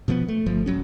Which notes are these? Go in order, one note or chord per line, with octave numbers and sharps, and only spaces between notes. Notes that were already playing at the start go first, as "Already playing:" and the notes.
B2 F3 A3 B3
A3
G1 F3 A3
D#1 F#3 C#4